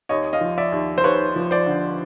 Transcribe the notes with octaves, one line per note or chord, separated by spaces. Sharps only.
D#2 C#5 D#5
D#5 F5
F3
D5 E5
D#2
C5
D#2 B4 C#5
F3
C5 D5
D3